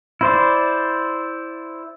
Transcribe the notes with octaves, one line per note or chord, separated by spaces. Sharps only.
E4 C5 D5